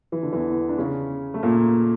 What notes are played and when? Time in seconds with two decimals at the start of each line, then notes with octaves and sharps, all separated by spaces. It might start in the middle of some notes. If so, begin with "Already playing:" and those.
0.12 E3
0.23 D3
0.32 E2 E3
0.69 D4
0.78 C#3 C#4
1.34 A3
1.43 A#2 A#3